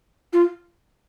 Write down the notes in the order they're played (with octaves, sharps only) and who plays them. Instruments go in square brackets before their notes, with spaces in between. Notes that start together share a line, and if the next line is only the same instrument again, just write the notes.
[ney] F4